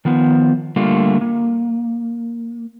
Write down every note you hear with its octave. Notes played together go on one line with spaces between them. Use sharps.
D#3 F3 B3
D3 G3 A3 A#3 F4 F5
A#3